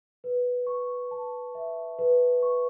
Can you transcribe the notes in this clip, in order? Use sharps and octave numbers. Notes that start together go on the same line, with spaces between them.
B4
C#6
A5
E5
B4
C#6